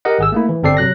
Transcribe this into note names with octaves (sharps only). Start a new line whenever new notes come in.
G4 A#4 D#5 F#5
G#1 G#4 E6
A3 A#3 E4
E3
G1 C4 A4 D5 C7
C3 F#3 F#6 A#6